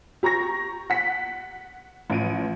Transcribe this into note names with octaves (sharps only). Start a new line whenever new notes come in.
G4 A#5 C#6 A#6
F#5 B6
A1 F3 D7 D#7